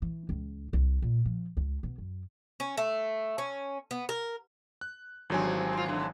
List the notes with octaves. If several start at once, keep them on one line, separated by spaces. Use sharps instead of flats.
E3
C#2
C2
A#2
F3
C#2
B2
F#2
C#4
A3
C#4
B3
A#4
F#6
G#1 E2 G2 F#3 C4 G#5
C4 F4
D3 E3